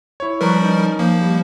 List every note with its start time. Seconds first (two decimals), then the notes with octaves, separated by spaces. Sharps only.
0.20 E4 C#5
0.41 F3 G3 A#4 B4 A#5 C#6
0.61 C#4 D#4
0.98 F3 A#3
1.21 G3